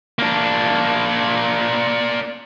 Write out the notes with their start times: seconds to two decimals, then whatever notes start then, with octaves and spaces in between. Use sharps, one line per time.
0.19 A#3 D4